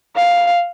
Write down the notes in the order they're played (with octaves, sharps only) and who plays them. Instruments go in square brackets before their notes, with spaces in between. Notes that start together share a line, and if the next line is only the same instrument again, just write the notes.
[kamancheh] F5